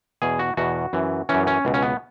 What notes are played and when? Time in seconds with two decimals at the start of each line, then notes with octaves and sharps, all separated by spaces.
0.22 E2 B2 G#4
0.39 F#4
0.57 E2 B2 F#4
0.93 F#2 E3
1.29 F#2 E3 C#4
1.47 C#4
1.65 C#2 B2
1.74 C#4
1.82 B3